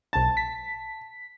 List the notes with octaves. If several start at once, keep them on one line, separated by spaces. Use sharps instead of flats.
B1 A5 A6
B6